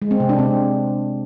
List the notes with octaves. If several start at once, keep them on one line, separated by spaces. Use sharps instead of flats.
G#3
C4
C3
D4
C4